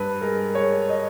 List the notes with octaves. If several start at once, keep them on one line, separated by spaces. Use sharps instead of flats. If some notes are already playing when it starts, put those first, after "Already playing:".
Already playing: G2 B4
G#3 A#4
G#3 C#5
D#5